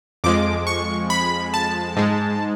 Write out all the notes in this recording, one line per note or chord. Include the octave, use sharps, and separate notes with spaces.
F2 F3 G#3 D6
C#6
B5
A5
G#2 G#3